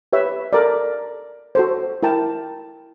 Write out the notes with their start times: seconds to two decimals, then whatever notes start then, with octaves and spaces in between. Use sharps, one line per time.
0.13 G4 B4 C#5 E5
0.53 A4 A#4 D5
1.55 F#4 A4 C5
2.03 E4 A#4 G5 A5